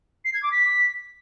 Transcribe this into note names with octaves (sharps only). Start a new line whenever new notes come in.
C7
G#6
D6
B6